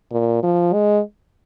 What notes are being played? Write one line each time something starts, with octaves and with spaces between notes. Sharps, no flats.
A#2
F3
G#3